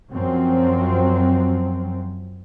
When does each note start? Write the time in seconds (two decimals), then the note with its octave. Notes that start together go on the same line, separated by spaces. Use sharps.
0.12 F#2 F3 F#3 C4